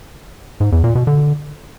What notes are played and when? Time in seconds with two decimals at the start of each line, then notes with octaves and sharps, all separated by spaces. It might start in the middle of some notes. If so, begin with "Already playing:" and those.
0.60 G#2
0.72 E2
0.84 A#2
0.95 B2
1.07 D3